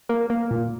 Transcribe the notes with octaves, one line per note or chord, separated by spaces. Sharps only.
A#3
A#3
A#2